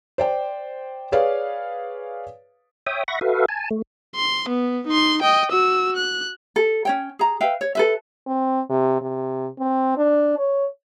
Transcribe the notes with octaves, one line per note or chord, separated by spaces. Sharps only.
C5 D5 G5
G#4 B4 C#5 D5 F5
C#5 E5 G5 D#6
E5 F#5 B5 C#6 A#6
F#4 A4 B4 E5 F5
G#5 A5
A3
C6
B3
D#4 C6
D#5 G5
F#4 E6
F#6
A4
C#4 C#5 G5
G#4 A#5
B4 E5 F5 G5
C#5
A4 B4 E5
C4
C3
C3
C4
D4
C#5